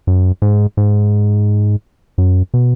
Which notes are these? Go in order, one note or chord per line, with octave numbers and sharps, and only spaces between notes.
F#2
G#2
G#2
F#2
B2